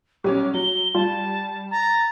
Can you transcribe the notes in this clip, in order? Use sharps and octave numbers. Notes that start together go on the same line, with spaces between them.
B1 G3 C#4 C#5 D6
F#3 G7
G3 F4 A5
A#5 A6